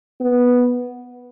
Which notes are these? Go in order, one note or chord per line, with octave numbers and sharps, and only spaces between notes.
B3